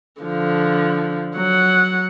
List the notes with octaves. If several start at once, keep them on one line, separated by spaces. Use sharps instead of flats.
D3 F3
F#3 F#5